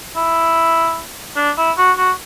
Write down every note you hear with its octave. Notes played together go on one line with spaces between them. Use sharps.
E4
D4
E4
F#4
F#4